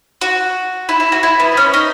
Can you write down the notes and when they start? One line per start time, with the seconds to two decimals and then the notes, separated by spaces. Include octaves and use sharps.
0.21 F#4
0.89 E4
1.00 E4
1.12 F#4
1.23 E4
1.40 B3
1.57 C#4
1.74 D#4